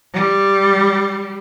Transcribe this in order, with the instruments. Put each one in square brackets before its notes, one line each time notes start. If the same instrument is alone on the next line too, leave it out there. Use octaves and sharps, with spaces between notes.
[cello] G3